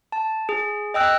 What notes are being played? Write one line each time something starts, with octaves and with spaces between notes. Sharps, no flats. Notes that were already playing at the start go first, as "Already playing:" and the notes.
A5
G#4
D#5 G5 E6 F#6